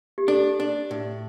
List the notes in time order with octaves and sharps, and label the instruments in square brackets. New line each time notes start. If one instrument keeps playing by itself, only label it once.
[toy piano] G4
[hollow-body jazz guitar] D4 [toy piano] A4
[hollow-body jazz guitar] D4
A2